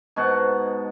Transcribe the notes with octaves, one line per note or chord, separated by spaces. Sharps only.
G#2 B2 F#4 A5